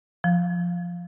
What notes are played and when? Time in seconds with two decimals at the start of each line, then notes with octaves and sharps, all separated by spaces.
0.24 F3